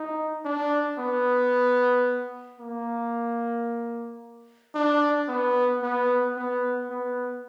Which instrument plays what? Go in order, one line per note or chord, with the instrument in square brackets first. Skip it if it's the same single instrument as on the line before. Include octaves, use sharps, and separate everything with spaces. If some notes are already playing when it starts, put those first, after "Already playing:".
Already playing: [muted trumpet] D#4
D4
B3
A#3
D4
B3
B3
B3
B3